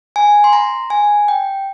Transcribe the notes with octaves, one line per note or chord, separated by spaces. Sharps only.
G#5
C6
A#5
G#5
G5